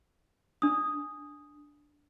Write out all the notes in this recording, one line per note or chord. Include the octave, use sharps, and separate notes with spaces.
D4 D#6